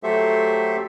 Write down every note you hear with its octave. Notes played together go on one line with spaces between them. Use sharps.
F#3 A3 G4 A4 C5 E5